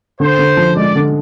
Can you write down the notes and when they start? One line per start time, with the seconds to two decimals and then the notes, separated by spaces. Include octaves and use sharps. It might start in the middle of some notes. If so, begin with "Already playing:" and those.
0.20 D3 C5
0.39 D3
0.57 F3
0.77 G#3 D5
0.96 D3